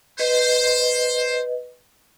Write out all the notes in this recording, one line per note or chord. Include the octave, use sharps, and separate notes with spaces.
B4 C5 D#5